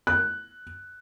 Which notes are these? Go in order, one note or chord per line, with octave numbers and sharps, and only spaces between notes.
F#6